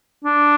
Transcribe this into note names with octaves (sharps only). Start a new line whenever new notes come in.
D4